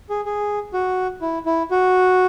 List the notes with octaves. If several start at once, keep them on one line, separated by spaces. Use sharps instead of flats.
G#4
G#4
F#4
E4
E4
F#4